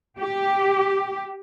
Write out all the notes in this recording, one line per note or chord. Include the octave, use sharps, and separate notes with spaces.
G4